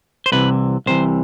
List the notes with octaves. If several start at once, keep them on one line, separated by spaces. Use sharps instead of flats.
C5
C2 C3 E3 B4
C2 C3 E3 C5